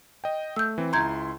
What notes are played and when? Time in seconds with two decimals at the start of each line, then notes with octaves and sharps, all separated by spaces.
0.24 D#5 G5
0.56 A3 E6 G6
0.78 E3 C4
0.93 C#2 E4 A#5 C6 G6 G#6